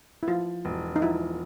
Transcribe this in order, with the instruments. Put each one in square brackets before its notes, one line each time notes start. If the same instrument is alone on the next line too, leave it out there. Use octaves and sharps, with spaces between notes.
[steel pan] E4
[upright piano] F3 [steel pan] F4
[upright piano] E1
[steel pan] D#4
[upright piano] F3 [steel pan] E4